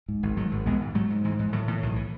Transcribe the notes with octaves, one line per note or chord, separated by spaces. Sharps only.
G#2
G#1
G#2 F#3 A3
G#1
G#1 G#3 B3
G#2
G#2 F#3 A3
G#2
G#2 E3 G#3
G#2
A2 D#3 F#3
A2 E3
B1 D#3
E3